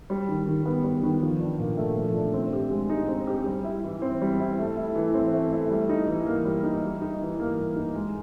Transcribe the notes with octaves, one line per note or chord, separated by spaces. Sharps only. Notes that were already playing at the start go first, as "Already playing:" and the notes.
G3
D#3
D#3
B3
G3
D#3
F3
D4
A#2
A3
F3
D4
C4
G4
G#3
D#4
C4
G4
G3
E4
E3
C4
G3
E4
A3
E4
E3
C4
A3
E4
G3
D#4
E3
A#3
G3
D#4
G3
D#4
E3
A#3
G3
D#4
G#3